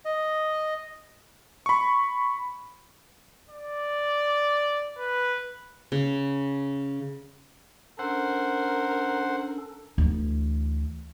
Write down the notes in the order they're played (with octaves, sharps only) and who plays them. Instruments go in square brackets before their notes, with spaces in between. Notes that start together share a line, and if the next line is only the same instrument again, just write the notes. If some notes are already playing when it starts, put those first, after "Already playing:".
[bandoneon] D#5
[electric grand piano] B5 C#6
[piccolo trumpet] D5
B4
[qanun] C#3
[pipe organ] C#4 D4 A4 [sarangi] A#4 [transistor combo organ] C5 F#5
[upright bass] D2 E3